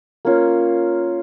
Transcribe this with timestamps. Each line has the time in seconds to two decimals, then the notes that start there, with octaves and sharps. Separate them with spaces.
0.25 A#3 C#4 F4